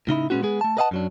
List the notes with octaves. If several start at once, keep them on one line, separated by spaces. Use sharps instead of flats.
A2 C#3 D#4 E4
A#2 G#3 B3 C#4 F4 F#4
G#3 B3 G#4
A3 A5
A#4 B4 D#5 F5 F#5 A5
F#2 F#3 D4